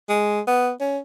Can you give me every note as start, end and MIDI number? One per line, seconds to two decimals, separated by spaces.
0.09 0.40 56
0.47 0.71 59
0.80 0.98 61